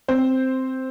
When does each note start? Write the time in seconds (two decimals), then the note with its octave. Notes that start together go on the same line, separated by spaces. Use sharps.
0.08 C4 C5